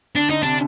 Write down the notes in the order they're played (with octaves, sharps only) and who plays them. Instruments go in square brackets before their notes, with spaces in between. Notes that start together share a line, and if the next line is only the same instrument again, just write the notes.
[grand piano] D3 [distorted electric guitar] D4
[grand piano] D3 [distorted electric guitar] D#4
[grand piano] C3 [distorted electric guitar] D4